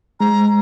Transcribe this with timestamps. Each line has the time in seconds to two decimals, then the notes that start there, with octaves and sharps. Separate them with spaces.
0.20 G#3 A#5